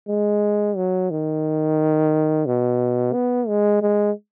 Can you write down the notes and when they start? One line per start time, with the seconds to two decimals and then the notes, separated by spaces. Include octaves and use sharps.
0.09 G#3
0.76 F#3
1.11 D#3
2.46 B2
3.14 B3
3.48 G#3
3.82 G#3